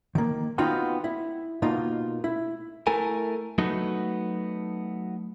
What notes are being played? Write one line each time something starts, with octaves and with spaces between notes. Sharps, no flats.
D#3 A#3
B3 C4 D#4 F4 F#4 G5
E4
B2 A#3 D#4 F4
E4
A3 E4 A4 A#4 G#5
F#3 A3 B3 D#4 F#4